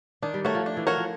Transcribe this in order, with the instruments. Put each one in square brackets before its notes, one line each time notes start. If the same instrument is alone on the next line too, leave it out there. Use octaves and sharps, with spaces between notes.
[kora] D#3 [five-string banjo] D4
[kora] G3
[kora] A3 [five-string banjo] F#4 A#4 C#5
[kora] F3
[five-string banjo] D4
[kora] E3
[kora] F3 [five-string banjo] F#4 A#4 C#5
[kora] F3